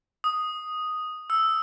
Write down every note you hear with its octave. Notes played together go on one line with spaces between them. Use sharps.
D#6
E6